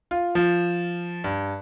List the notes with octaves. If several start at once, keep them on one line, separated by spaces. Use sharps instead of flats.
F4
F3
G2